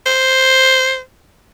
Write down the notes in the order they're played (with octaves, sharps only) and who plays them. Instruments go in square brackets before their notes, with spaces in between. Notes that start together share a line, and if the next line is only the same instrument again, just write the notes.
[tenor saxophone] C5